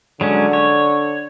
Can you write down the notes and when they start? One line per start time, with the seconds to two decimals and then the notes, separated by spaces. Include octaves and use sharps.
0.21 D3 F#3 G#3 C#4
0.53 C#5